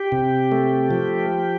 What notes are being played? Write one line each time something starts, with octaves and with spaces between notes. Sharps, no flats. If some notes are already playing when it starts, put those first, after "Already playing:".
Already playing: G4
C3
A3
F3